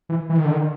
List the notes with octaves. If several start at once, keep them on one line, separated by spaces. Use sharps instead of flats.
E3
E3
D#3
D3
D#3